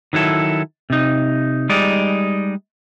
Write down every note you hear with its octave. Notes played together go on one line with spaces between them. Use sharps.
D#3 F#3 E4 A4
C3 D#4
G3 G#3 D#4 D5